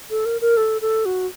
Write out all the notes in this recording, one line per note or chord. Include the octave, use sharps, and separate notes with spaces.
A4
A#4
A#4
A4
A4
F#4